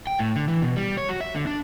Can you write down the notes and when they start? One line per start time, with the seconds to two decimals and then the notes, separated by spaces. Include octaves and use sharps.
0.07 G5
0.19 A2
0.36 D3
0.48 E3
0.62 B2
0.76 G3
0.97 C#5
1.09 F#4
1.21 E5
1.35 D3
1.47 D4